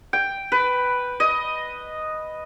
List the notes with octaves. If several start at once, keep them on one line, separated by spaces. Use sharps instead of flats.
G5
B4
D#5